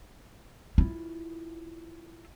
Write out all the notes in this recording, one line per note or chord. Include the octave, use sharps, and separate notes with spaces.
E4 F4